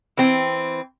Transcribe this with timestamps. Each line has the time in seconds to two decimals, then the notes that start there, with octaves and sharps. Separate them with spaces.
0.17 E3 C4